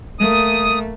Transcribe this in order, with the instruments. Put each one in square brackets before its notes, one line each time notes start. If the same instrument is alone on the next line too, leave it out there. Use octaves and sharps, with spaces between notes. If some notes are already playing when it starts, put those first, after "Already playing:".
[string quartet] A3 A#3 [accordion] D#6